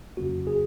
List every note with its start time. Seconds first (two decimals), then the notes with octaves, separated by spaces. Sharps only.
0.17 F2 C#3 F#3 A#3 C#4 F#4
0.47 G#4